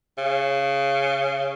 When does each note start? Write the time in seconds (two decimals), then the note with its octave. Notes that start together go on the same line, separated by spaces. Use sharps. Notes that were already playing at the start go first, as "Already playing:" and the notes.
0.18 C#3